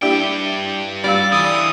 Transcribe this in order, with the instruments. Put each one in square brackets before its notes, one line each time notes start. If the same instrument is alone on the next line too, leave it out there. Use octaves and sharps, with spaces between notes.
[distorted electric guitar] G2 G5 [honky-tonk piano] D4 E4 G4
[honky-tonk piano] G3 F4 E6 [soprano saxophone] D5
[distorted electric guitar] D3 E3 [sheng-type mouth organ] D#6